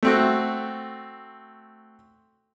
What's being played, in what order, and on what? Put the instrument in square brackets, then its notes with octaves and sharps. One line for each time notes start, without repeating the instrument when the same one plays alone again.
[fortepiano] A3 C4 F#4